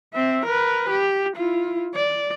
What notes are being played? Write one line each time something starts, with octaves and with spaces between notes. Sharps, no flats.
C4 E5
A#4 B4
G4
E4 F4
D5